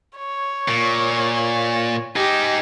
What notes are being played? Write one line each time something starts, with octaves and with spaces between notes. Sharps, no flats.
C#5
A#2
D#4 G4 G#4